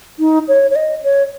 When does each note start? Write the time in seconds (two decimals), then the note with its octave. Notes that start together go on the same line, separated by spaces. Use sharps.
0.19 D#4
0.48 C#5
0.71 C#5
0.76 D#5
1.04 C#5